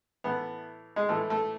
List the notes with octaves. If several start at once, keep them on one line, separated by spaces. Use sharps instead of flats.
A2 E3 B3
G#3
A2 E3 A3
A3